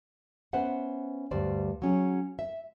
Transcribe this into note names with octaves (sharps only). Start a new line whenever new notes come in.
B3 C#4 B4 C5 E5 F#5
D2 G2 G3 C5 D5
F#3 C#4 G#4
E5